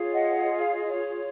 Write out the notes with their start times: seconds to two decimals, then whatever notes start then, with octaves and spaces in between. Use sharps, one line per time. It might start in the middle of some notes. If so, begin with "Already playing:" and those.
Already playing: F4 G#4 C#5
0.14 D#5 F#5
0.57 C#5 F5
0.72 D#5
0.86 C#5